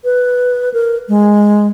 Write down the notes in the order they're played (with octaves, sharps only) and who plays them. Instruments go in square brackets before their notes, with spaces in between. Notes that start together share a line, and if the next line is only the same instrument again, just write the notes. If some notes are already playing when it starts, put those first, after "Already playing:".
[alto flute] B4
A#4
G#3